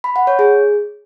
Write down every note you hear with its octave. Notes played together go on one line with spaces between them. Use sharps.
B5
F#5
C#5
G#4